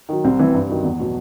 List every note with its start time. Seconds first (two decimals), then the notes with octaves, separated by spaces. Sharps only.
0.09 D#3 F#3
0.24 C2 C4
0.39 C3 E3 G3
0.54 G2
0.69 D#3 F#3
0.84 E2
1.00 B2 F#3